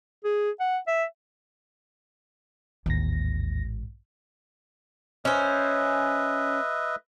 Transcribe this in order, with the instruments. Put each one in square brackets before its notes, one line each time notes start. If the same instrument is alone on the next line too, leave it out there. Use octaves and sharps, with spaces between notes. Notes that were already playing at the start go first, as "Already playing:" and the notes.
[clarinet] G#4
F#5
E5
[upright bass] A1 G#2 [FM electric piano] D#2 A#6
[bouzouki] C#4 C5 [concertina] B4 D#5 E5